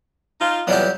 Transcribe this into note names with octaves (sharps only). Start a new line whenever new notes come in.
D#4 F4
F2 E3 F#3 G3 B3 G4